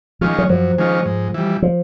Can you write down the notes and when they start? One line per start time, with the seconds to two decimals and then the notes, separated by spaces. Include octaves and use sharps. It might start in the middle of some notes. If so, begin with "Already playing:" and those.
0.21 D#3 F3 G#3 C#4 F4
0.38 F#3
0.49 F#2 F3
0.78 D#3 G#3 C#4 F4
1.06 G#2
1.34 E3 G3
1.62 F3